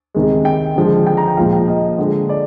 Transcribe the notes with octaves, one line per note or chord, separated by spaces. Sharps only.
C3 D#3 G#3
G5
D3 F3 G#3
G5
A#5
G5
A#2 F3 G#3 F5
G5
D#5
D3 G#3
D5